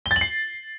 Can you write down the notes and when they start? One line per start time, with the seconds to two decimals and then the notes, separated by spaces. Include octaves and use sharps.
0.06 G7
0.11 A6
0.16 F#7
0.21 C7